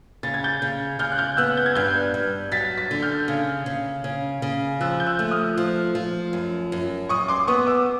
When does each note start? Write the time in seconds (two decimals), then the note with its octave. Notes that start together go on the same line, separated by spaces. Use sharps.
0.23 C#3 A6
0.34 G#6
0.44 G6 A6
0.62 C#3
0.99 C#3 F6 G6
1.12 F#6
1.18 F6 G6
1.37 B3 E6 F#6
1.57 G6
1.66 G#6
1.75 G2 F6 G6
2.14 G2
2.51 F#3 A6 B6
2.77 A6 B6
2.91 D3
3.02 F6 G6
3.28 C#3
3.66 C#3
4.04 C#3
4.42 C#3
4.81 F3 E6 F#6
5.00 G6
5.06 E6 F#6
5.19 A3
5.31 D#6 F6
5.57 F3
5.95 F3
6.33 F#2
6.72 F#2
7.09 F#2 C#6 D#6
7.28 C6 D6
7.47 B3 C#6 D#6
7.67 D6 E6